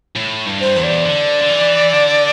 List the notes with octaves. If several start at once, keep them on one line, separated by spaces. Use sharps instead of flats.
A2
G2
C5
E2
D5
D3
D3
E3
D3